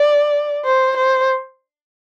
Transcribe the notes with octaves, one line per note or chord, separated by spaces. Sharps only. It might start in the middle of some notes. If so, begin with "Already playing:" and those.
Already playing: D5
C5
C5